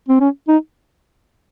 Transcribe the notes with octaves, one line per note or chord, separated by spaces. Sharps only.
C4
C#4
D#4